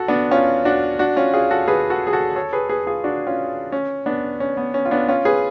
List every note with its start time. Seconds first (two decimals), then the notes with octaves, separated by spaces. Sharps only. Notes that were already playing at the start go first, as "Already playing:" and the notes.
Already playing: F#4 A4
0.08 B3 D4
0.31 C#4 F4
0.65 D4 F#4
0.99 D4 F#4
1.16 C#4 F4
1.34 F4 G#4
1.51 F#4 A4
1.68 G#4 B4
1.90 F#4 A4
2.07 G#4
2.13 F#4 A4
2.36 A4 C#5
2.53 G#4 B4
2.69 G#4 B4
2.87 F4 G#4
3.04 D4 F#4
3.27 C#4 F4
3.72 C#4
4.06 B3 D4
4.40 C#4
4.57 B3
4.74 C#4
4.85 F4
4.91 B3 D4
5.08 C#4 F4
5.25 G#4 B4